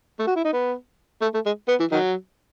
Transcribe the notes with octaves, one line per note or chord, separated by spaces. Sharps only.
A3
F#4
E4
D#4
B3
A3
A3
G#3
B3
E3
D#3 F#3